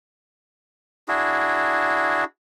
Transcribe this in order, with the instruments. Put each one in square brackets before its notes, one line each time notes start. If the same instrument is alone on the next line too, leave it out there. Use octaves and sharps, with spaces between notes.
[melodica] D4 E4 F#4 G#4